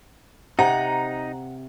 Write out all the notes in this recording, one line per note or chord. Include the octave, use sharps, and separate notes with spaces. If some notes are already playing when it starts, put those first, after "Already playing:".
C3 D#4 F#5 A#5